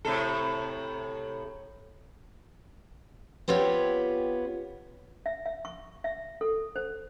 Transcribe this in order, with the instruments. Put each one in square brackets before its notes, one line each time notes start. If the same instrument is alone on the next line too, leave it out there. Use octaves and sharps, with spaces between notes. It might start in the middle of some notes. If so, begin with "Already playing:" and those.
[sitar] A2 C3 A4
[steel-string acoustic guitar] B3 C4 F4 G4 C#5
[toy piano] E5
E5
C#6
E5
A4
C5